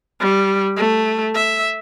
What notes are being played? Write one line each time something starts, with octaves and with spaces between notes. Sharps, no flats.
G3
A3
E5